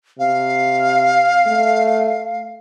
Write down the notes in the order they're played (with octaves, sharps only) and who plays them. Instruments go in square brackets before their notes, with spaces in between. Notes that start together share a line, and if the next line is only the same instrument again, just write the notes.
[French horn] C3 [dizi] F5
[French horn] A3